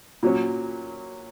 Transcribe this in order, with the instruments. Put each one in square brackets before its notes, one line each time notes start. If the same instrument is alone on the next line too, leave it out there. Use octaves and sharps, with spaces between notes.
[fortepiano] A#2 F#3 C#4